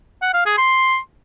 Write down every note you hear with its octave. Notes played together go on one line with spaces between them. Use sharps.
F#5
F5
G#4
C6